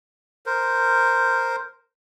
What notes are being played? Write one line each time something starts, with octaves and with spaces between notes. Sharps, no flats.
A#4 C5